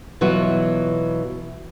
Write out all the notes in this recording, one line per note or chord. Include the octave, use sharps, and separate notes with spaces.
B2 E3 F#3 F4 F#4